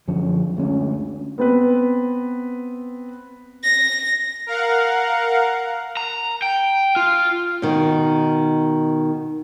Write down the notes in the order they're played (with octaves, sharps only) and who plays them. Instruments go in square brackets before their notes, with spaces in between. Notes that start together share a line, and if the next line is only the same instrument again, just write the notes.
[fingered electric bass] F#2 D3 F3 C#4
D2 G#3 C#4
[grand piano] B3 C4 B4
[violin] A#6
[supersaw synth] A#4 F5 F#5
[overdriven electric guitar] A#5
G5
F4
[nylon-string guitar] B2 D#3